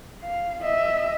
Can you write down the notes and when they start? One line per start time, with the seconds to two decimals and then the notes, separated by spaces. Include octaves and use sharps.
0.23 F5
0.63 D#5 E5